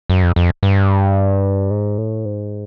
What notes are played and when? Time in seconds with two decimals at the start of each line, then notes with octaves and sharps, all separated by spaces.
0.10 F#2
0.23 F2
0.36 F2
0.63 G2
1.71 G#2
1.98 A2
2.25 G#2